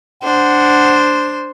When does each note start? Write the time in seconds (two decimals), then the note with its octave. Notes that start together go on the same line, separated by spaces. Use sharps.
0.23 D4 C5 F#5